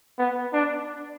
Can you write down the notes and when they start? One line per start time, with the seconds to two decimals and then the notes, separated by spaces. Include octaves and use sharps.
0.19 B3
0.53 D4